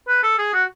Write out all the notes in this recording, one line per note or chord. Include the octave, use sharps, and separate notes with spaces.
B4
A4
G#4
F#4